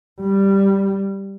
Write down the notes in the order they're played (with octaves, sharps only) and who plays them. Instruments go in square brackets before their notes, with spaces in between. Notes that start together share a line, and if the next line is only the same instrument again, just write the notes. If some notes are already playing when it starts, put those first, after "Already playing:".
[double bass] G3